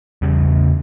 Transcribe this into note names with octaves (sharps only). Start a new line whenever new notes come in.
E2 C#3 G3